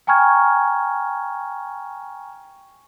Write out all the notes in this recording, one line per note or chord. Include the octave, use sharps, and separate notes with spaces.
G5 G#5 A#5 C#6 F6 G#6